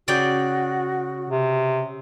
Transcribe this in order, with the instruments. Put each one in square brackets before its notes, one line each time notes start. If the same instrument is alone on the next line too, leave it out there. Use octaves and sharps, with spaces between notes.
[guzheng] C#3 D5 G5 [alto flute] F#4
[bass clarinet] C3